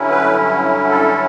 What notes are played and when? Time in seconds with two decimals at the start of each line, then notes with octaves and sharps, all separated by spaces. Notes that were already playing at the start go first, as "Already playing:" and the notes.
Already playing: G2 D3 F#3 C#4 E4
0.10 B4
0.89 A4